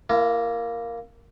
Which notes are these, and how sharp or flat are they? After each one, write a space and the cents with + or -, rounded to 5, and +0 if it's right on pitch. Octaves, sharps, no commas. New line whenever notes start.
A#3 +0 E4 +40